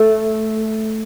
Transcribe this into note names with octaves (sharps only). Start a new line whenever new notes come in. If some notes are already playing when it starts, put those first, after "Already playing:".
Already playing: A3